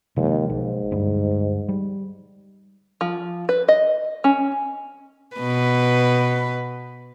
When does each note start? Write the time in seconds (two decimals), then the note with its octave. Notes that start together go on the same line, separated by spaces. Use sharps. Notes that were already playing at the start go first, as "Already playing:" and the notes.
0.17 D#2 C3 F3 G#3
0.49 B1 G#2
0.91 D2 G2 G3
1.69 G3
3.01 F3
3.49 B4
3.68 D#5
4.24 C#4
5.36 B2 B4